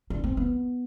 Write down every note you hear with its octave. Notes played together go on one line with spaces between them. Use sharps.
D4
C4
B3